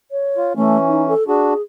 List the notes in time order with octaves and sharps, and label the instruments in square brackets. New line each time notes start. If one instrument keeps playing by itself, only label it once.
[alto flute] C#5
[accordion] F4
[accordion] E3 C#4 [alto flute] A3
[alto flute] D#4
A4
[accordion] D4 F#4 [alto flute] G#4